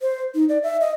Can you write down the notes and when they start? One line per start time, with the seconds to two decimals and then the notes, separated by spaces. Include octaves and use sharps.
0.01 C5
0.35 D#4
0.49 D5
0.63 E5
0.81 D#5